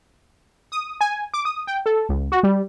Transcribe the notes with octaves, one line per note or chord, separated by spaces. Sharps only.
D#6
G#5
D6
D#6
G5
A4
C#2
F#4
G3